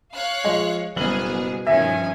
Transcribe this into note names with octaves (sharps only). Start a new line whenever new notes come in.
C#5 F5 F#6
F3 G#3
F#1 B2 G3 B3 G#4 F#7
G2 D#3 F3 C#4 E5 G#5